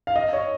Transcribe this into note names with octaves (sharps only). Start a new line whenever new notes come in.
F5
D#5
C#5